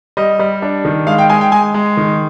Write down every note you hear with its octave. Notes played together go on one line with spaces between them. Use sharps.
G3 D#5
G3
D4
D#3
G#3 F5
G5
G#3 G#5
G5
G#3 G#5
G#3
D#3